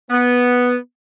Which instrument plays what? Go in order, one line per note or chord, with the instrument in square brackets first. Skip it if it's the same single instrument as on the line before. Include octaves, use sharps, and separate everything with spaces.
[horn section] B3